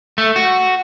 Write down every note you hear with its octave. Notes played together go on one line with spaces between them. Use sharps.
A3
F#4